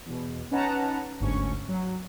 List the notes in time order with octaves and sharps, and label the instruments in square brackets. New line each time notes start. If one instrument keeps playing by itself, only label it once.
[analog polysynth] E2 B2
C#4 D#4 B4 F#5 A5 A#5
G1 D2 G#2 C#4 C#6
F#3